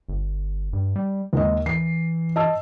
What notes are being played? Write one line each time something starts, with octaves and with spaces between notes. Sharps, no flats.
G1
G2
G3
D#2 D#3 G#3 D#5
E3 C7
D#5 A5 E6